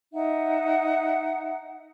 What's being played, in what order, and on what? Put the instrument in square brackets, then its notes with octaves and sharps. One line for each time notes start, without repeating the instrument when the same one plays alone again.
[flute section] D#4 E5 F#5